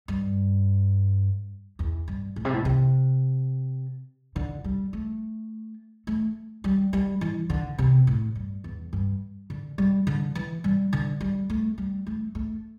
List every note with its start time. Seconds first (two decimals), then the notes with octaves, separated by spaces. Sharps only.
0.08 G2
1.79 E2
2.08 G2
2.36 A2
2.45 C3
2.53 A2
2.65 C3
4.36 D3
4.64 G3
4.93 A3
6.07 A3
6.64 G3
6.93 G3
7.21 E3
7.50 D3
7.78 C3
8.07 A2
8.35 G2
8.64 E2
8.93 G2
9.50 D3
9.78 G3
10.07 D3
10.35 E3
10.64 G3
10.93 D3
11.21 G3
11.50 A3
11.78 G3
12.07 A3
12.35 A3